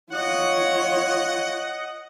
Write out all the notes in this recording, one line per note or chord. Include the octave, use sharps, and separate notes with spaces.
F4 C#5 D#5 F#5